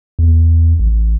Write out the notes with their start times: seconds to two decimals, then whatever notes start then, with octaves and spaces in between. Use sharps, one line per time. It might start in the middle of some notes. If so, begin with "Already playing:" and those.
0.19 E2
0.79 A1